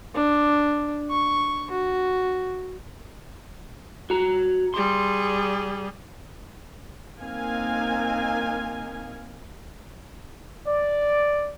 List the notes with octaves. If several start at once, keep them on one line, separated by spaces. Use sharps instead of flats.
D4
C#6
F#4
F#4 A#5
G3 G#4 C6
A#3 C4 D#4 F5 G#5
D5